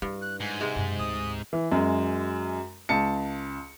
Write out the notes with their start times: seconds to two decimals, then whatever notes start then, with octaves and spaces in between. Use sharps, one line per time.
0.02 G2 E4
0.22 F#6
0.40 G#2 G#5
0.61 C3 G#3
0.76 F#2 B2
0.99 D2 D#6
1.53 E3
1.72 F#2 G#3
2.89 C#2 A5 C#7